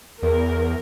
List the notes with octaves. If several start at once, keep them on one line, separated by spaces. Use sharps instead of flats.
E2 A#4